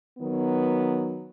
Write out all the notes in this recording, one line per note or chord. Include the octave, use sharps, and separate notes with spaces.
D#3 F#3 B3